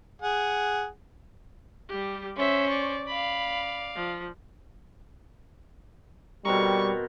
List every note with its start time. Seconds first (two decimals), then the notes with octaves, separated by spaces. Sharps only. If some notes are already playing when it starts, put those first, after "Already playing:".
0.22 G#4 F#5
1.88 G3 G4
2.37 C#4 C5 C#5 E5
2.69 D5 C#6
3.08 D5 F5 B5
3.95 F3
6.45 B2 G3 C4 A#4 C#6